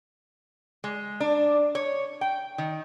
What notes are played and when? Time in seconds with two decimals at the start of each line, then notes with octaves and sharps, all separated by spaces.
0.84 G#3
1.20 D4
1.75 C#5
2.21 G5
2.58 D#3